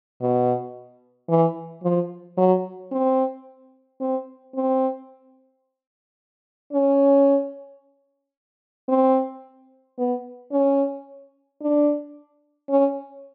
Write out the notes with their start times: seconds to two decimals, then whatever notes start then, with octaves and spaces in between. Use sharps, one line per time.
0.21 B2
1.29 E3
1.83 F3
2.37 F#3
2.92 C4
4.00 C4
4.55 C4
6.73 C#4
8.89 C4
9.98 B3
10.52 C#4
11.61 D4
12.69 C#4